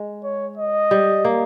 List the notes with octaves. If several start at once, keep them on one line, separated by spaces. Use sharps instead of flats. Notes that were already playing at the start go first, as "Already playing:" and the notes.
Already playing: G#3
C#5
D#5
G3
A#3